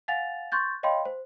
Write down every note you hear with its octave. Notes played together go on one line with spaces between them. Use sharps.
F5 F#5 G#5 A6 F7
C6 C#6 F#6 G6 A6
C#5 D#5 F5 G5 B5 C6
C5